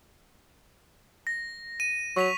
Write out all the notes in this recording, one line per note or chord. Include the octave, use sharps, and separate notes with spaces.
A#6
D#7
F#3 C#6 B6 F7